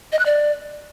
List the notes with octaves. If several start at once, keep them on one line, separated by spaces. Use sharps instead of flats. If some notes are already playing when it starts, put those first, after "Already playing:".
D#5
F#6
D5